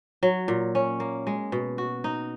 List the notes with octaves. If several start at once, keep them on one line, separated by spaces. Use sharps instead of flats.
F#3
A#2
C#4
A#3
G#3
B2
F#4
D#4